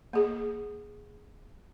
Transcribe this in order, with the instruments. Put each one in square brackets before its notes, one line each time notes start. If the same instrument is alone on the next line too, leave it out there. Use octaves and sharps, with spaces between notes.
[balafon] A#3 G#4